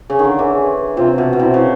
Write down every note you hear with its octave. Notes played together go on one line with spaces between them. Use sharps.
C#3 G#4
D#3
D3
E3
G#4
C3 F4
B2
B2
C3 E4
C#3